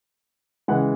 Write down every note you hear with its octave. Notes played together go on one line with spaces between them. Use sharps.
C#3 E3 G#3 F#5